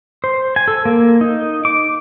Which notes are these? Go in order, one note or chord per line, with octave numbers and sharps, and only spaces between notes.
C5
G#5
A4
A#3
D#4
D6